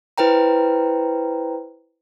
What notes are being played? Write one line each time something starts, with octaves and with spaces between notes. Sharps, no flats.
E4 B4 C5 G5 A#5